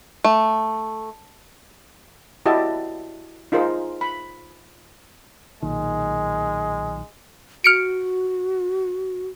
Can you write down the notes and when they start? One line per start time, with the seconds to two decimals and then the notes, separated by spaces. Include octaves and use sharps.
0.24 A3
2.46 E4 F#4 G4 D#5 E5 A5
3.52 D#4 F4 G#4 A#4 C5
4.01 B5
5.63 B1 A#2 D#3 G#3
7.64 F#4 F6 C#7 D7